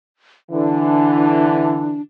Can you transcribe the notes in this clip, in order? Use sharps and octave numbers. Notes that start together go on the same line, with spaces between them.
D3 E3 D4